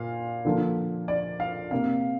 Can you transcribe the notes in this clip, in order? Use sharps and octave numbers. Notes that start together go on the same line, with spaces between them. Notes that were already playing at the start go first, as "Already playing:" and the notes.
Already playing: A#2 F5
D3 F3 A#3
D5
F5
C3 A#3 F5